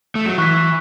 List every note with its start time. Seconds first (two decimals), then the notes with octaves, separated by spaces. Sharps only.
0.15 A3
0.26 F#3
0.38 E3 C#6 F#6 B6